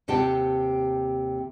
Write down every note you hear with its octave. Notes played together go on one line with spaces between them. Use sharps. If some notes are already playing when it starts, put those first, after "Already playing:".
D#2 C3 G4 F#5 G5 A5